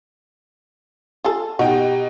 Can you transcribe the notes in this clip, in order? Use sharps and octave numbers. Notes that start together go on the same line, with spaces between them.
F4 G#4 A4
B2 D#4 F#4 G4 G5